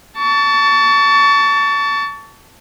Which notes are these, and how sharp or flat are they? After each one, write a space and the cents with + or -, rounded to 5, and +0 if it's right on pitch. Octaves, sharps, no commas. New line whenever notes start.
A5 +5 C#6 +35